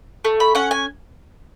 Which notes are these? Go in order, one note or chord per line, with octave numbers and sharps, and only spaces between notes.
A3
B5
C#4 F#5
G#5